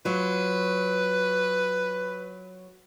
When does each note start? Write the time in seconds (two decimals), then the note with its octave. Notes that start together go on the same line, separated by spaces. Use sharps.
0.05 F#3 F4 B4